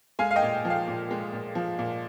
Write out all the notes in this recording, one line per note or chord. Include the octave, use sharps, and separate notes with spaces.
G#3 F5 G#5
F5
D#5 G5
A#2
F3
F5
A#2
G#3
A#2
F3
A#2